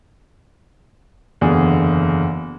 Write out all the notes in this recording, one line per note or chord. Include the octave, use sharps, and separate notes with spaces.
F#1 E2 D3 G#4 D5 D#6